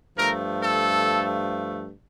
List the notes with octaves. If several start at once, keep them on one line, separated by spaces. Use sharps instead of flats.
G2 F3 A3 A#4
A4